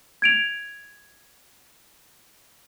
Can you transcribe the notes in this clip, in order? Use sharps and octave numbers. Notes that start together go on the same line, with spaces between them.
G#6 D7 F7